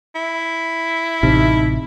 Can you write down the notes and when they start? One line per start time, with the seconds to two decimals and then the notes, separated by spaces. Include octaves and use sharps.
0.15 E4
1.23 A1 C3 D#4